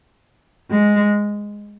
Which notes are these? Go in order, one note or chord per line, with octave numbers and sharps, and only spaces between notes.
G#3